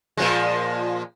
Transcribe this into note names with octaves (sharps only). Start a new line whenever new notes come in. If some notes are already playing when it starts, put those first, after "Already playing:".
A#2 F3 G#3